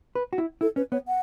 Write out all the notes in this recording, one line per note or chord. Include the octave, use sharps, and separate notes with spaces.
B4
F#4
E4
E4 A4
C#4 B4
B3 C#5
F#5